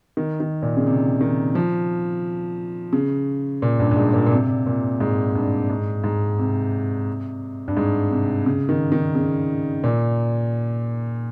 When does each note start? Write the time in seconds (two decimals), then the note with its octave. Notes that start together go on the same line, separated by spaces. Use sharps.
0.17 D#3
0.40 D#3
0.63 A#2
0.77 C#3
0.87 C3
1.21 D#3
1.55 F3
2.93 C#3
3.62 A#2
3.79 G2
3.91 G2
3.97 G#2
4.14 A#2
4.27 A#2
4.32 C3
4.67 A#2
5.00 G#2
5.35 G2
5.70 G#2
6.04 G#2
6.39 C3
7.68 G2
7.77 G#2
8.11 C3
8.46 C#3
8.69 D#3
8.92 D#3
9.15 C#3
9.84 A#2